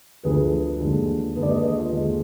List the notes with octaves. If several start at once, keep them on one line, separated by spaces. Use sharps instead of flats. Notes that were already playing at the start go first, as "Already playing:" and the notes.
D2 D3 F3 G#4 B4
D#2 D3 G#3
D#2 D3 G#3 G#4 B4
D5
B4 D#5
B4 D#5
F4
D#2 D3 G#3